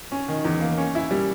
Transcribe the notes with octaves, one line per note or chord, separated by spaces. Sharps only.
C#4
D#3
E2
A#3
C#4
E4
G3